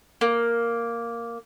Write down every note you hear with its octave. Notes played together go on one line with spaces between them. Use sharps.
A#3